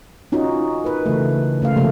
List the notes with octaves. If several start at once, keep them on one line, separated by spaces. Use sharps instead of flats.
C#4 D#4 F4 F#4
A#4 B4
C#3 E3 A3
C#3 A3 F5
C3 F3 A3 A#3